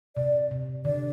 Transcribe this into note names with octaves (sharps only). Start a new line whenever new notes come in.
C3 D5
C3
D3 D5